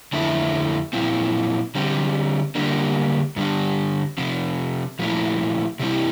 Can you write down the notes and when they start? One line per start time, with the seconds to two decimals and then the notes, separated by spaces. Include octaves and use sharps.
0.13 F2 D3 A3 E4
0.93 A#2 F3 C4 E4
1.75 D3 G3 C4
2.55 D3 G3 A#3 D4
3.36 G2 D3 G3 D4
4.18 C3 F3 C4
4.99 A#2 F3 A3 E4
5.79 C3 E3 G3 C4 E4